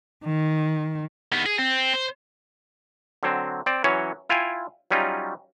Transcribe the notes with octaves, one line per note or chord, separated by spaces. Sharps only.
D#3
D#3 B3
G#4
C4
C5
D3 F#3 C4
C4 D5
E3 F#3 C#4 C#5
E4 F4 F5 G5 G#5
F#3 G3 C#4 D#4 F4